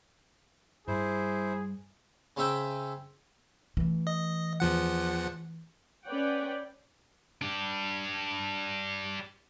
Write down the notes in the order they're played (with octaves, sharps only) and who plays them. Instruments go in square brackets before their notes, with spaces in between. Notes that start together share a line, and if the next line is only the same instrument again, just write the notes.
[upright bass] G2 G3 [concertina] E4 C5 [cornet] G#4
[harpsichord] C#3 C4 C#4 E5 G5
[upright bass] E3 A3
[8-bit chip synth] D#5
E2 F3 F#5
[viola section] C#4 B4 C#5 D5 F#5 G5
[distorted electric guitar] D4 G4